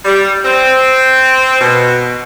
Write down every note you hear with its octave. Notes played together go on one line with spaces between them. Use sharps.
G3
C4
B2